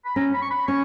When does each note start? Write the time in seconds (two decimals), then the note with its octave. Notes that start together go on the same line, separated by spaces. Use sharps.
0.05 B5
0.16 C#4 A#5
0.33 B5
0.42 C#6
0.51 B5
0.67 C#4 C#6